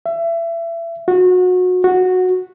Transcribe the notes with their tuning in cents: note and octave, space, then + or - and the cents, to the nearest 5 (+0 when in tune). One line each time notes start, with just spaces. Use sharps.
E5 +30
F#4 -25
F#4 -10